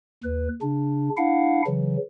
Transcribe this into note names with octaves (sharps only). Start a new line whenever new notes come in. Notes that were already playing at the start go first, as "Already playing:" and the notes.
D#2 B4
C#3 D4
D4 E4 F5 F#5
C#3 E3 F#3